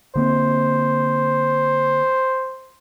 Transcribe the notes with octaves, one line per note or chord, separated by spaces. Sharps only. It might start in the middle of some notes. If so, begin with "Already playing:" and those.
D3 A#3 C4 C5